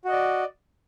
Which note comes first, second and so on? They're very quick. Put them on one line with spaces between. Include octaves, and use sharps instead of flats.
F#4 D#5 D5